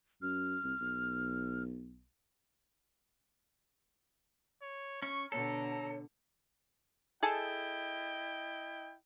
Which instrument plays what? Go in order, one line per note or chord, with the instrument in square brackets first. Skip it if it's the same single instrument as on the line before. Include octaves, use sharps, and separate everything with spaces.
[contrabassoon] F#2 [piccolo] F6
[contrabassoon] C2
B1
[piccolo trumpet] C#5
[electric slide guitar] C#4 [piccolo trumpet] C#6
[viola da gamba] B2 D3 [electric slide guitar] A4 [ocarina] C#5 [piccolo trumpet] A#5
[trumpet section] E4 D#5 G5 [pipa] G#4 A4 A5